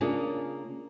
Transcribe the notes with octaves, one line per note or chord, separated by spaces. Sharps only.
C#3 A#3 C#4 D4 F4 G#4